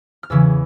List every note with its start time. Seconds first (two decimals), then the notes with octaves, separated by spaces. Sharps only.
0.23 F6
0.30 E2 C#3 E3 E6